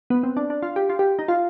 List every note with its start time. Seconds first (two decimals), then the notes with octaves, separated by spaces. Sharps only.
0.10 B3
0.23 C4
0.37 D4
0.50 D4
0.62 F4
0.76 G4
0.89 F4
0.99 G4
1.19 D#4
1.28 F4